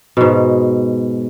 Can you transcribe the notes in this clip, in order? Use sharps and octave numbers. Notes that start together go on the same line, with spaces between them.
G#2 B2